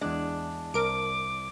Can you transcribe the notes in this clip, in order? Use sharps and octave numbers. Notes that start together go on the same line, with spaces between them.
E2 G#3 D4
C2 A#4 D6 D7